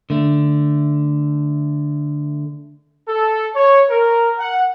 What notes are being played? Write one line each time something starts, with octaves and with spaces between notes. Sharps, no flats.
D3 A3
A4
C#5
A#4
F#5